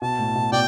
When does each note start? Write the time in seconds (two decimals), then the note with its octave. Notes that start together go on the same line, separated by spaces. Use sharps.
0.02 B2 A5
0.19 A2
0.35 B2
0.52 B2 D5 G5